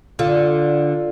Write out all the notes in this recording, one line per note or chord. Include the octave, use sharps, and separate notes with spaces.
D3 F4